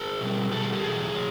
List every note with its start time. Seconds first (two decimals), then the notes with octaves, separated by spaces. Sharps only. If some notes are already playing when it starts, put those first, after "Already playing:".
Already playing: G#4 A#4
0.21 B2 G3
0.51 B2 G3 G4 A4
0.62 G#4 A#4
0.72 G4 A4
0.83 E2 B2 F#3 G#4
1.15 F#3